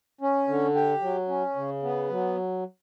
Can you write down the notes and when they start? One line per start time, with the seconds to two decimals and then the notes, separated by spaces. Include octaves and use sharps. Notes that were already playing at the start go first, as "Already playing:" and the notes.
0.21 C#4
0.48 D3
0.75 G4
1.01 F#3
1.28 C#4
1.56 C#3
1.83 B3
2.10 F#3